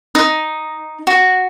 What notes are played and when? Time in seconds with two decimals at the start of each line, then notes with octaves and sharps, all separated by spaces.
0.15 D#4
1.07 F#4